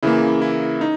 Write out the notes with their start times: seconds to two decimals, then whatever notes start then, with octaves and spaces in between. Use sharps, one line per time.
0.03 C#3 E3 A#3 E4
0.42 E4
0.81 D#4